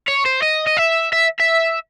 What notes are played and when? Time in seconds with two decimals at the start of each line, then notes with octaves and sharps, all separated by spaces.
0.08 C#5
0.26 C5
0.43 D#5
0.67 D#5
0.78 E5
1.13 E5
1.40 E5